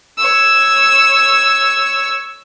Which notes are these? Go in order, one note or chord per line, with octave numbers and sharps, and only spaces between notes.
C#5 E6